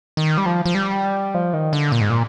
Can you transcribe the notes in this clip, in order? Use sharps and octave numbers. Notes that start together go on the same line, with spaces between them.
D#3
G3
F3
F3
G3
F3
D#3
D3
A#2
G#2
A#2